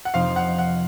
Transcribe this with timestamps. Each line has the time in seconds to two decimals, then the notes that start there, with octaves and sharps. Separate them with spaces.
0.05 F#5
0.14 F2 C3 F3 C4 D#4 F5
0.36 F#5
0.58 F#5